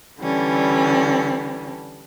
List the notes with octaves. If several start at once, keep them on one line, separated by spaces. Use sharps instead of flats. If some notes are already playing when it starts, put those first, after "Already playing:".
D3 E3 G3 C#4